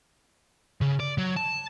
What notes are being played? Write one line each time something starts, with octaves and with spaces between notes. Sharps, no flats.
C#3
D5
F#3
A5